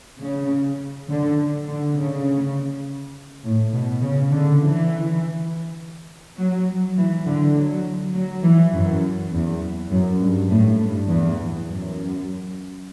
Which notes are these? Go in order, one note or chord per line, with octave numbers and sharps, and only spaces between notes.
C#3
D3
D3
C#3
A2
B2
C#3
D3
E3
F#3
E3
D3
F#3
F#3
E3
F#2
E2
F#2
G2
A2
G2
E2
F#2